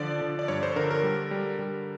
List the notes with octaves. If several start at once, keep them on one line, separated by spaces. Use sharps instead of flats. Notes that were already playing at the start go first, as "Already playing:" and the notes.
Already playing: D3 F3 D5
D3
D5
G2 C#5
C5
D3 A#4
A#4
G3
G3
G3